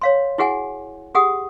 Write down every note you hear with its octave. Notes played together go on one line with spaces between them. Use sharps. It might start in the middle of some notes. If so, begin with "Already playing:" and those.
C#5 F5 C6
E4 F#4 G#4 F#5 G#5
G4 G#4 F#5 D#6